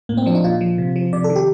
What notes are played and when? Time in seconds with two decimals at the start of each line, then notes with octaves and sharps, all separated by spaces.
0.09 A2 A#3
0.17 C4
0.26 F3 D4
0.35 D#4
0.44 A#2 F4
0.61 F3
0.78 C3
0.96 F3
1.13 C3 D5
1.24 A4
1.30 D#3
1.36 G4